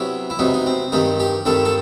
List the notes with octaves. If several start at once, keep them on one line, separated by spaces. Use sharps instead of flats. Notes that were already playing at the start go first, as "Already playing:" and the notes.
Already playing: C3 F#3 B3 E4
E4
C3 F#3 B3 D#4
D#4
C4
G2 D#3 G3 C4 D#4
G4
G2 D#3 G3 C4 A4
A4